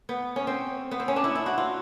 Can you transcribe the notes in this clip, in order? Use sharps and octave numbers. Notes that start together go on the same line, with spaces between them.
B3
C#4
C4
B3
C4
C#4
D4
E4
E4
F#4
F4